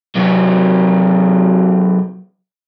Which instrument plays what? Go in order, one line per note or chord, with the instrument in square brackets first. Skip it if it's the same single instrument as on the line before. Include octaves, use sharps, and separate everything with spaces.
[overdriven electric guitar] C3 F#3